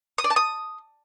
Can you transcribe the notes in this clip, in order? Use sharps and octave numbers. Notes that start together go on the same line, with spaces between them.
D#6
D5
A5
D#6